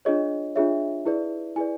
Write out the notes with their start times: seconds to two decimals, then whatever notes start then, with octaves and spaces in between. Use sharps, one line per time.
0.05 D4 F4 G#4 C#5 D#5
0.55 D4 F4 G#4 C#5 E5
1.05 E4 G#4 B4 D5
1.56 E4 G#4 B4 D5 G#5